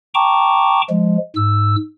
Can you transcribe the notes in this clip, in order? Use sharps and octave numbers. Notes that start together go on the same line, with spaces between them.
G5 A5 A#5 C#6 D6
F3 G#3
G#2 E6